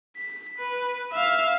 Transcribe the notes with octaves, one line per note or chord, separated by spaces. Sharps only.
B6
B4
E5 F5